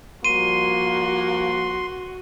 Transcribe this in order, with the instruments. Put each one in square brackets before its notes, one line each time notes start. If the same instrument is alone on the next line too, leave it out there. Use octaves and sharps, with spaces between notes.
[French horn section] F3 G3 A#3 [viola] F#4 [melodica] C6 [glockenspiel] D#7